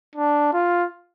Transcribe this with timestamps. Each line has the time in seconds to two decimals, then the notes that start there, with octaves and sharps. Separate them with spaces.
0.16 D4
0.53 F4